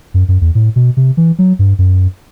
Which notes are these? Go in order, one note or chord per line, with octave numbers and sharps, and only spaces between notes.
F#2
F#2
E2
A2
B2
C3
E3
F#3
G2
F#2